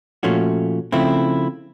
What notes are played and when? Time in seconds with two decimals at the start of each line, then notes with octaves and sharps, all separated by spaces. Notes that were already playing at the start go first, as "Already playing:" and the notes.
0.23 A#2 F3 A3 C#4 F#4
0.92 C#3 F3 A3 C4 E4